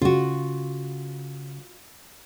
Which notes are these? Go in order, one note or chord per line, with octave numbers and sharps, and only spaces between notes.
C#3 F4 F#4